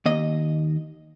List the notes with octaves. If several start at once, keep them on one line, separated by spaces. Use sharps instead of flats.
D#2 D#5